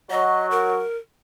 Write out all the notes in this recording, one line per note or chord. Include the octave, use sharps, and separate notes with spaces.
F#3 F#4 D#5
A#4